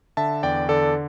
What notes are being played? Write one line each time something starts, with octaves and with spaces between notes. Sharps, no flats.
D3 E5 A5
E2 D5 G5
D3 A4 D5